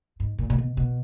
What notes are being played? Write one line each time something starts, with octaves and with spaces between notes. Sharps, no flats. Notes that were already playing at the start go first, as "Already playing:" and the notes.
G#2
A#2
A#2
B2
B2